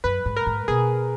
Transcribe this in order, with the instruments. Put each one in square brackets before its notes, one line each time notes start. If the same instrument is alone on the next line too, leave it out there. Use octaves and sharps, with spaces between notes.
[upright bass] F#2 [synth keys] B4
[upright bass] G#2
[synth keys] A#4
[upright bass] G#2
[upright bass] B2 [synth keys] G#4